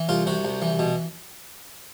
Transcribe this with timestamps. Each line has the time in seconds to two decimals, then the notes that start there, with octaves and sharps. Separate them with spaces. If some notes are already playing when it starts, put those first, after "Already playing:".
Already playing: E3
0.09 C2 F4
0.27 C3 F#4
0.45 C2
0.62 E3
0.79 B2